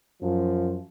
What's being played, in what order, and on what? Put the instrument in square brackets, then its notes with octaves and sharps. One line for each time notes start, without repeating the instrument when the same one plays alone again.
[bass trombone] F#2 [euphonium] F3